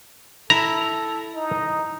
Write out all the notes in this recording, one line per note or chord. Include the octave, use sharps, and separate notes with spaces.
E4 A4 A#5
D#4